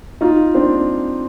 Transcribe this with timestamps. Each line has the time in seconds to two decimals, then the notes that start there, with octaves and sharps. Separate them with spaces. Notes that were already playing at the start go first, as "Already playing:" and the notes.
0.21 D#4 F4
0.54 C4 D4